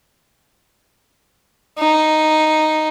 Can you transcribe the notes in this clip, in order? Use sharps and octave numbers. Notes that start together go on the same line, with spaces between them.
D#4